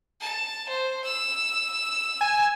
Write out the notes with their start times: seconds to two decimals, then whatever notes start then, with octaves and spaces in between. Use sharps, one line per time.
0.21 A5
0.68 C5
1.04 E6
2.21 G#5